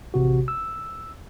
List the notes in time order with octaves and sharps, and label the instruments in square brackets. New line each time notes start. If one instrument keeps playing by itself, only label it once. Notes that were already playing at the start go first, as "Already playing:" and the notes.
[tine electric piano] A1 C3 F#4
E6